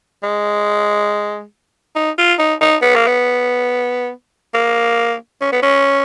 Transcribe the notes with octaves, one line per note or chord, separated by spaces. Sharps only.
G#3
D#4
F4
D#4
D#4
B3
A#3
B3
A#3
C#4
B3
C#4